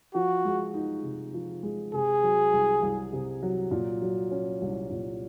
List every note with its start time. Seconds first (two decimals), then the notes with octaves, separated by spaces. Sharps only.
0.14 F3 F#4
0.45 G#3
0.74 D#4
1.03 C3
1.34 F3
1.63 G#3
1.93 C3 G#4
2.23 F#3
2.53 C2
2.82 C2
3.13 C3
3.43 F#3
3.71 A#2
4.02 F#3
4.31 C#4
4.62 C2
4.90 A#2